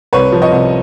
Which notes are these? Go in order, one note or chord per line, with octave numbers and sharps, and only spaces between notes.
C2 B4 C#5
F3
C#5 D#5
C2